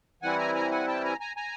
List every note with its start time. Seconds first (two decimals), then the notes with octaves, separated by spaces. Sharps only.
0.22 E3 G3 C4 E4 F#5 G#5
0.38 G#5 A#5
0.55 G#5 A#5
0.71 F#5 G#5
0.88 G5 A5
1.04 G#5 A#5
1.20 G#5 A#5
1.36 G#5 A#5